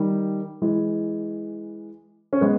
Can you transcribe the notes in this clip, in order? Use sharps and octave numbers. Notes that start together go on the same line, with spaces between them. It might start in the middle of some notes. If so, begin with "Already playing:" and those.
Already playing: D#3 G3
E3 G#3
C#4
G#3 B3